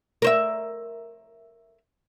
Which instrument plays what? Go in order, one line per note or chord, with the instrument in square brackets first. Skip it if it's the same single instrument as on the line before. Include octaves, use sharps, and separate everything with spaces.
[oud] A#4 C5 E5